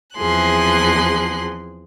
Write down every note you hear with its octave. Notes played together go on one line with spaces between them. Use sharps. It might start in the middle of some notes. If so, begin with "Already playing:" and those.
E2 F3 C4 G#4 C6 F#6